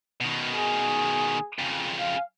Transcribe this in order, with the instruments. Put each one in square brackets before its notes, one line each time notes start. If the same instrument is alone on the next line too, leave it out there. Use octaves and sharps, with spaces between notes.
[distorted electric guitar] B2 D#3
[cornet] G#4
[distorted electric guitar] F2 C#3
[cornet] F5